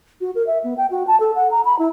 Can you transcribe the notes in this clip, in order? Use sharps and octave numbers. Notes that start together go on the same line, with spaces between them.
F#4
A#4
E5
B3
G5
F#4
A5
A4
F#5
A#5
B5
E4